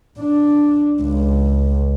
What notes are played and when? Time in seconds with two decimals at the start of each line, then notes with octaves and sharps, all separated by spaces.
0.20 D4
1.02 C#2